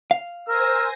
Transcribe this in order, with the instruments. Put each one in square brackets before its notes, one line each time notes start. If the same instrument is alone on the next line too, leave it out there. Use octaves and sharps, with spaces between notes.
[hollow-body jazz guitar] F5
[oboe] A#4 [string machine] C5 G#5 A#6 [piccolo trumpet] E6